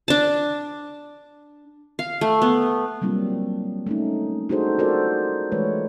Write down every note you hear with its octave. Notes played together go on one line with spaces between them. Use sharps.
D4 A5
F5
A3
B3
F#3 G3 A#3 C4 D4 F4
A3 C#4 D#4
D4 D#4 F#4 G#4 A4 C5
F4 F#4 A4 A#4 C5 D5
E3 G#3 A3 B4 C#5